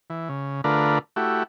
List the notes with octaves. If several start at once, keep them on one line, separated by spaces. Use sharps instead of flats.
E3
C#3
D3 A3 D4 F4 A#4 B4
A3 E4 F#4 G4